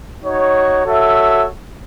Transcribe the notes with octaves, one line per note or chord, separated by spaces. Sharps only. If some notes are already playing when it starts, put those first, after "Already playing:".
D#4 F#4 C#5
F#4 A4 C#5 E5